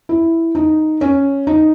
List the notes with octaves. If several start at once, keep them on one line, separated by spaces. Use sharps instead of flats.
E4
D#4
C#4
D#4